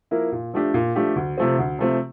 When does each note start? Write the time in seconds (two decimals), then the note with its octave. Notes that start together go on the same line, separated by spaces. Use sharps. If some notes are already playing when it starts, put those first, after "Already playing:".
0.11 F3 A#3 E4 A#4
0.32 A#2
0.54 F3 A3 D4 G4
0.74 A#2
0.95 F3 A3 D4 G4
1.16 D2
1.37 C3 F3 A3 C4
1.59 D2
1.79 C3 F3 A3 C4